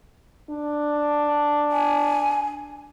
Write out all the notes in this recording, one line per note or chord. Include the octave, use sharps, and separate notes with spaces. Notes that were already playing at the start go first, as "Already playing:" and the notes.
D4
G#5